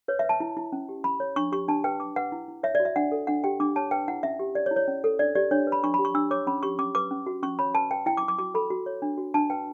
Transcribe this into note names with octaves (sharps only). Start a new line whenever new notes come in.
B4 C#5
E5
B4
A5
E4
E4
C#4
G4
C#4 B5
C#5
D4 C#6
G4 C#6
D4 A5
B4 G5
B4 D6
B4 F#5
E4
E4
C#5 E5
D5
F#4
E5
D4 F#5
A4
D4 F#5
G4 G5
D4 D6
C#5 A5
B4 G5
E4 F#5
C#4 E5
G4
C#5 D5
C#5
E4
C#5
C#4
A4
D4 D5
G4 D5
D4 C#5
B4
B5
D4 C#6
B5
G4
C#6
D4 E6
C#5 D6
C#4 B5
G4 C#6
C#4 D6
B4 D6
C#4
F#4
C#4 C#6
C#5 B5
B4 A5
B4 G5
E4 G5
D6
E4
D6
F#4 D6
A4 B5
F#4
C#5
D4
F#4
D4 A5
B4 G5